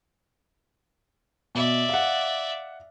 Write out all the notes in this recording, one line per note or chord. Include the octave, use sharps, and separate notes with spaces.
B2 D5 E5
F5 F#5